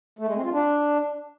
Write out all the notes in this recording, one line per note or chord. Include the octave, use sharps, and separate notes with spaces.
A3
G#3
C4
F4
D4